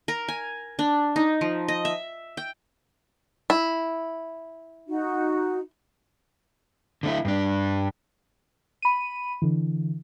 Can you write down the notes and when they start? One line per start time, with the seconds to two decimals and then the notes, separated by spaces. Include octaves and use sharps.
0.08 A#4
0.28 G#5
0.79 D4
1.16 D#4
1.41 F3
1.68 D#5
1.85 E5
2.37 G5
3.50 E4
4.88 D#4 F#4
7.03 D3 A3 E4
7.25 G2 D4
8.82 B5 D#7
9.42 D3 E3